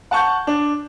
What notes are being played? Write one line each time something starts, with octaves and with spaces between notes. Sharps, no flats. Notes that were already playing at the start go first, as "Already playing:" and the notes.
F#5 A5 C#6 G6
D4